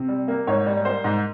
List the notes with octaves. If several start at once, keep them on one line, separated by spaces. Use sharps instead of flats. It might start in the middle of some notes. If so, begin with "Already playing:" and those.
Already playing: C3
G3
A#3
G#2 C#5
G3
A#3 C5
G#2